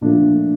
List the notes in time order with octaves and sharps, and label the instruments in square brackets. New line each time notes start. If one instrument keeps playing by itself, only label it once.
[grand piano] A#2 F3 A3 D4